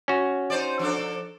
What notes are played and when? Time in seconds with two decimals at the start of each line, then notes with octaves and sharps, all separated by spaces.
0.08 C#4 F#4
0.50 D#4 C5 D5
0.79 F3 D4 A4